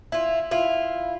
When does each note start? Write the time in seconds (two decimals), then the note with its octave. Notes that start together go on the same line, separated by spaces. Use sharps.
0.12 E4 F4
0.51 E4 F4